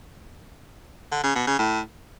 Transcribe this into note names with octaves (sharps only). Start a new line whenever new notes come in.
D3
C#3
B2
C#3
A2